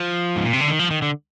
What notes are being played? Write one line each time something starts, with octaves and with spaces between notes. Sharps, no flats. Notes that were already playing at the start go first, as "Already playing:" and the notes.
Already playing: F3
G#2
A#2
C3
D3
D#3
F3
D#3
D3